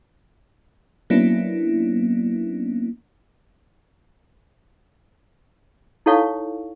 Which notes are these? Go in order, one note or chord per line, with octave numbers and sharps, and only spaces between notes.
F#3 A#3 B3 C#4 D4 E4
D#4 E4 A4 C#5 F5 C#6